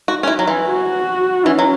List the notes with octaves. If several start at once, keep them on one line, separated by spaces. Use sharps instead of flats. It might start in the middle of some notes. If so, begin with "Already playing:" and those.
F#4
C#4
E4
F#3
E3
F#4
E3 C#4
F#3